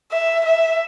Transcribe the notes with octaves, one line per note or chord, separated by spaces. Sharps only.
E5
E5